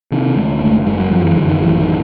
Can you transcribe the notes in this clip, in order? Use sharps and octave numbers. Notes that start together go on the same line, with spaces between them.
C3 D#3
D2 G#3
F#1 A3
F#2 G#3
F#3
F#2 F3
E3
F#2 D3
D#3
A1 E3
D#3